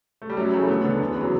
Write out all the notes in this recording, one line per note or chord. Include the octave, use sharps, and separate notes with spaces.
A3
G3
F#2 F#3
C#3 E3 A3
D2 B3
D3
E2
C#3 E3 F#3